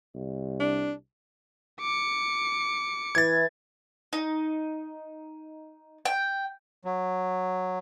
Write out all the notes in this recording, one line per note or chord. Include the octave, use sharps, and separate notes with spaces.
C2
D4
D6 C#7
E3 G#6 A6
D#4
G5
F#3